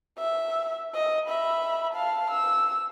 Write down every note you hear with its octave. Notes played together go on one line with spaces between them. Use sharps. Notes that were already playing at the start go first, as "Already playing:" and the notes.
E5
D#5
E5 B5
F5 A5
E6